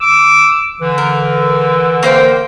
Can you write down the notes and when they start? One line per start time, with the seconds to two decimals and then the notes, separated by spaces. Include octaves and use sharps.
0.01 D6 E6
0.81 D3 E3
0.98 A#4
2.03 A#3 C5 G5